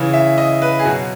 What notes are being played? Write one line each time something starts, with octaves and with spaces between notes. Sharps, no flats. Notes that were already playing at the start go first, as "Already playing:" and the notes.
Already playing: C#3 E3
E5
D#5
B4
G#4
B2 F#3 F#4